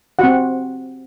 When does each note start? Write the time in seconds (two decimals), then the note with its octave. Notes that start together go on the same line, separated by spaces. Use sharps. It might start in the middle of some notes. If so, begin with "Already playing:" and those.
0.19 C4 F#4 F#5